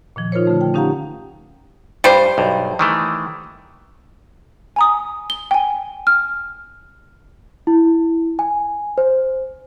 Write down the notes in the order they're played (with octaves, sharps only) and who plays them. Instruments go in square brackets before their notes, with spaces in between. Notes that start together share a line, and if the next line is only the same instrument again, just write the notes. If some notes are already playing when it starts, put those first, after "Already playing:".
[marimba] A#2 D#3 F3
D#4 F4 A#4 C5 C#5
D3 A3
G5
C#4 D#4 G4 F5 F#5 A#5
[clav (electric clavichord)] G2 [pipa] G3 C5
[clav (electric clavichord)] B1 G2
D#3 E3 A3
[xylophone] G#5 A#5 D#6
G7
G5 G#5
F6
[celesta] E4
G#5
C5